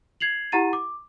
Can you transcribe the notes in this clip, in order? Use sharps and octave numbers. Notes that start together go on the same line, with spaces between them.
G#6 C7 F7 F#7
E4 G4 F#5 A#5 A6 D#7
D6